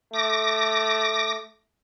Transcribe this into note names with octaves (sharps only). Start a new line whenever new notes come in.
A3 D6 A#6